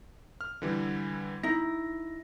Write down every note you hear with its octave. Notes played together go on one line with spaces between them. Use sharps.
F6
D3 E3 G3
D#4 E4 A#6